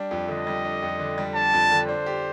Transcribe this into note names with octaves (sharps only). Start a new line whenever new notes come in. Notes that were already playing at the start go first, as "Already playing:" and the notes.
Already playing: G3 D4
F2
D3 D#5
G3
D4
F2
D3
G3
D4 A5
F2
D3
D4 C5
G4